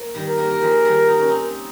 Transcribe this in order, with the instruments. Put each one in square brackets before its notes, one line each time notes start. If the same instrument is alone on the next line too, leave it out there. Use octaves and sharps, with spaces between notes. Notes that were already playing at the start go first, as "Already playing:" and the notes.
Already playing: [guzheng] A#3
D#3 G3
[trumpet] A#4
[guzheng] G3 A#3
A#3
F3 G#3
D#3 G3
D#4
C#4
C4 D#4